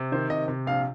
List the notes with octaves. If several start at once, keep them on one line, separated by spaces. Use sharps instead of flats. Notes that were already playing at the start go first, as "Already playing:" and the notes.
Already playing: C3
D#3 C5
C3 D#5
C3
A#1 F5